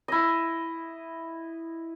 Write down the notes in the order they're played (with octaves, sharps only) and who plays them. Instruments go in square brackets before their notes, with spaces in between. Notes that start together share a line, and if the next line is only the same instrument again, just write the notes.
[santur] E4 D#5